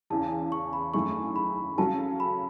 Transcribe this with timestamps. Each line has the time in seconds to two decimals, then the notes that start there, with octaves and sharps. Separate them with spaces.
0.10 E2 C#3 E3 A5
0.52 C#6
0.73 B5
0.94 F#2 D#3 A3 E4 G#4 C#6
1.36 B5
1.78 C#3 F#3 C#4 F#4 A4 A5
2.20 B5